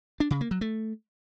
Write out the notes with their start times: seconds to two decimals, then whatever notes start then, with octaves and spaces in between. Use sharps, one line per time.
0.20 D4
0.31 C#3
0.41 A#3
0.51 F#3
0.61 A3